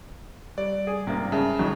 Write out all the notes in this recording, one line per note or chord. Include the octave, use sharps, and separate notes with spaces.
G3 D5
G#4
G#2 C3 A#3
C#3 E5 A5
C2 F2 D#3 F#3 D#4